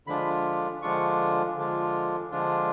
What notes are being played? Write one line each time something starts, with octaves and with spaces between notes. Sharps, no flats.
D3 F3 G#3 D4 F4 B5
D3 F3 G#3 D4 F4 C#6
D3 F3 G#3 D4 F4
D3 F3 G#3 D4 F4